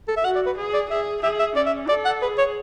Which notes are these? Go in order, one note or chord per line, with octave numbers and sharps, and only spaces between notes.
A4
E5
F#4 F#5
D5
B4
G#4
D5
G#4 E5
G#4 E5
E5
C#4 D5
E5
A4 D5
F#5
G#4 B4
C#5